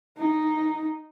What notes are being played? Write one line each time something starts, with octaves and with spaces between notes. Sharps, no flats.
D#4